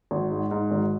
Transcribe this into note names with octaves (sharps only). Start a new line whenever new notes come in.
G#1
G#2
G#2
G#1